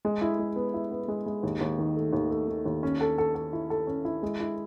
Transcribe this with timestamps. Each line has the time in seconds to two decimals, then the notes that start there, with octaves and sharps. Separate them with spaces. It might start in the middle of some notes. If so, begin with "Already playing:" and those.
0.05 G#3
0.21 E4
0.39 G#3
0.56 B3
0.74 E4
0.91 B3
1.08 G#3
1.26 G#3
1.43 D#2
1.61 D#2
1.79 D#3
1.96 A3
2.13 D#2
2.31 A3
2.48 D#3
2.66 D#2
2.83 C#4
3.01 A4
3.18 A4
3.35 A4
3.53 E4
3.70 A4
3.87 C#4
4.05 E4
4.23 G#3
4.40 E4